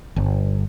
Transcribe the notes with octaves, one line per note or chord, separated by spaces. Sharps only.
G1